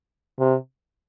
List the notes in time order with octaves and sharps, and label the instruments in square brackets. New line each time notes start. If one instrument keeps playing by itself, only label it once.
[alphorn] C3